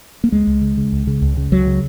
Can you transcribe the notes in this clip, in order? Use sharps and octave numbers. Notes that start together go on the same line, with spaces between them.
A#3
C#2 G#3
C#2
C#3
C#3
C#2
C#3
C#2
C#3
C#2 F#3
C#3